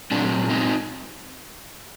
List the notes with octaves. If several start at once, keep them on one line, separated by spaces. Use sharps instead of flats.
A#2 F#3 C4 D4
C4 D#4